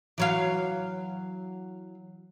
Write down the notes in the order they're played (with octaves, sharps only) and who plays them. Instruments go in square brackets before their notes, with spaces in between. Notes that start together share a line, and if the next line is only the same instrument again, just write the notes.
[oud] E3 F#3 F5